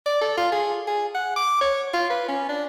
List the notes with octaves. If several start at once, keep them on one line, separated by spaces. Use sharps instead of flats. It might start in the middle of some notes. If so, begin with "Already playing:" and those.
D5
A4
F4
G#4
G#4
F#5
D6
C#5
F4
B4
C#4
D4